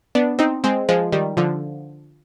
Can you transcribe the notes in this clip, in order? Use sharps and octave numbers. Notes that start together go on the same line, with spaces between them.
B3 D4
C4 D#4
G#3 C4
F3 G#3
D#3 G3
D3 F3